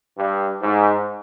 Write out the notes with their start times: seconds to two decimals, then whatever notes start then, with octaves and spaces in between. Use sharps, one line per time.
0.17 G2
0.62 G#2